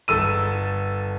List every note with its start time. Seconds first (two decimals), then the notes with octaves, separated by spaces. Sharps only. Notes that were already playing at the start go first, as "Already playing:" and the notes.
0.08 G1 A4 E6 D#7